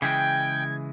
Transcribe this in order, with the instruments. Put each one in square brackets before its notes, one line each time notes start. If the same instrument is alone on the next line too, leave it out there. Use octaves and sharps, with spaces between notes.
[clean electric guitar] C#3 E3 G#3 [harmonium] G5 [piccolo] G#6